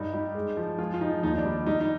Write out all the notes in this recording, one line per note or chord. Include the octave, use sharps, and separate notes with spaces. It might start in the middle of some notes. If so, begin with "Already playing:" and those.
Already playing: G2 D#4
G3 D#4 G4
G#3
F3
G#3 F4 G#4
F4
F3 D#4
D#2 D#4
D#4
D4
G3
G3 D#4
D#4